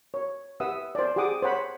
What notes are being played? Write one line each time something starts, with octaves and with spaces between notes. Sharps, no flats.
C#5
G4 B4 E5 F#5 D#6 E6
C5 D5
G4 G#4 F#5 D6 D#6
C5 C#5 F#5 B5